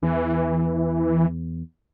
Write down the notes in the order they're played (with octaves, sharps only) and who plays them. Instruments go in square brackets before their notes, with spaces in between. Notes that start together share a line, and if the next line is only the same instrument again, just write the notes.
[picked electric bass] E2 [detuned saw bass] E3